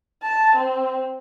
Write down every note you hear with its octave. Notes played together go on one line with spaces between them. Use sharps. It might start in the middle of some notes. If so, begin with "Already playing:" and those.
A5
C4